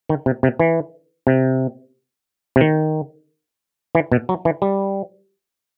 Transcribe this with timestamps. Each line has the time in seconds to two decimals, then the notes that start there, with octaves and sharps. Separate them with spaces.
0.09 D#3
0.26 C3
0.43 C3
0.60 E3
1.27 C3
2.56 C3
2.61 D#3
3.95 E3
4.12 B2
4.29 F#3
4.45 E3
4.62 G3